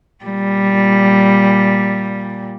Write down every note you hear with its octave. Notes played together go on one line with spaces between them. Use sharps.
A#2 G3